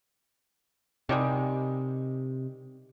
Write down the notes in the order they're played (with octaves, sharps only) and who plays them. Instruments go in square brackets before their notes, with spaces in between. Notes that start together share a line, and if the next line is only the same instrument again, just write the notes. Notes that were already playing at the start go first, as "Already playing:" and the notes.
[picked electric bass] C3 [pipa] D#3 G3 G#3